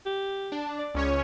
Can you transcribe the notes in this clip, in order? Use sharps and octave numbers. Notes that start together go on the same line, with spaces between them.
G4
D4
D5
C#2 C#4 C#5